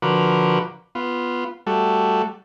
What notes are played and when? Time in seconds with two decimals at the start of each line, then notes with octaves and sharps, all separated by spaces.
0.02 D3 F3 F#4 A#4 B4 D6
0.95 B3 F4
1.67 G3 A3 F#4 A4